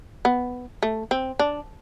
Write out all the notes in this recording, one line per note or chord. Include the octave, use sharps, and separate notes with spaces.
B3
A3
C4
D4